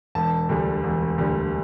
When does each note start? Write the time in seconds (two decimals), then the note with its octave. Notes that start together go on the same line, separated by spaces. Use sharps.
0.15 E1 A5
0.49 D2 D3 G3
0.83 E1
1.18 D2 D3 G3